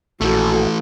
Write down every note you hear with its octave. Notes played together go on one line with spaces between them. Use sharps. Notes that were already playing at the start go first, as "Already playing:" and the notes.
A#1 E3 A3 F#4 A4